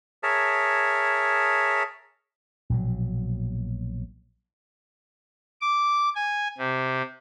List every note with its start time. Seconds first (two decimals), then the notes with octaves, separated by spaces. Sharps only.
0.23 G#4 A#4 C#5 E5 A5
2.70 A#1 B2 F#3
5.61 D6
6.15 G#5
6.58 C3